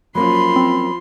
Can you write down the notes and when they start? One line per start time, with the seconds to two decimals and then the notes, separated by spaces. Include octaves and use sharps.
0.15 F3 F#3 A#3 C#4 B5 C6
0.56 C4